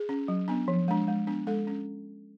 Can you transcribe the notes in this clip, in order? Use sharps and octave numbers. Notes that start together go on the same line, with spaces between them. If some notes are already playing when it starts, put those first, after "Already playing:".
Already playing: G#4
C#4
F#3
B3 D4
F3
G#3 D4
G#3
B3 D4
G#3 A4
C#4